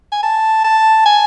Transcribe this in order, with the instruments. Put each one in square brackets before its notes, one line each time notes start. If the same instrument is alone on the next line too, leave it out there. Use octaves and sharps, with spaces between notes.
[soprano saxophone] G#5
A5
A5
G#5